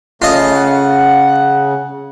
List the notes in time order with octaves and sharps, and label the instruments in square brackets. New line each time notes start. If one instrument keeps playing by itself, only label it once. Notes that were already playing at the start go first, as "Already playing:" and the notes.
[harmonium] C#3 [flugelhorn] A3 [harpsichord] F4 D#5
[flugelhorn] F#5